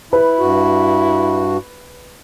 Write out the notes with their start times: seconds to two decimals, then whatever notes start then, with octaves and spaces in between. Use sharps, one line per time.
0.13 E4 B4
0.39 G2 F#4